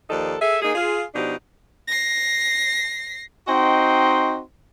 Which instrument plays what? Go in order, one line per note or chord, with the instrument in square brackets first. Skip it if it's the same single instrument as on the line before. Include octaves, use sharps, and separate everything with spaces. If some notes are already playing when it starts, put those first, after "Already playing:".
[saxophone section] D#2 F3 D#4 A4 D5
G#4 A4 E5
A#3 D#4 G#4
F4 G#4
B2 F3 D4 D#4 G4
[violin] A#6 C7
[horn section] C4 D#4 F#4 D#5 G5 C6